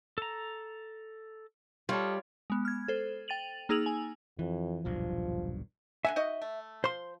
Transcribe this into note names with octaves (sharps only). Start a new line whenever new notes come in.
A4 A#5
G3 F4 A4 C#5 D#5 F5
G#3 B3
F6 G#6
A4 C5
G5 A6 D#7 F7 F#7
A#3 D#4 G#4 E6 F7 F#7
G#5
F2 E3
D#1 B1 G2 F3
D3 E5 F#5 G#5
D#4 F#4 D#5
A3
F3 C5 C6